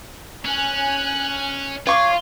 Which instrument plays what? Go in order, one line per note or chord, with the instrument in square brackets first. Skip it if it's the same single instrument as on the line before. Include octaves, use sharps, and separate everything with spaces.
[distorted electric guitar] C#4 [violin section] G#5 F#6
[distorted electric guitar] F4 [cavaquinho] C#5 C#6 D6 [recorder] F5